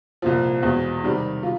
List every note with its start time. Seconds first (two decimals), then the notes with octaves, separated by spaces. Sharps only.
0.22 C2 A#2 F3
0.62 E2 B2 G#3 C4
1.04 C3 D#3 G3 C4
1.43 F4